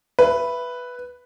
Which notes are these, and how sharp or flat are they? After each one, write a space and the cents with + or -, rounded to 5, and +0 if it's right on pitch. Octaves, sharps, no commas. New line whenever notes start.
B4 +0 E5 +20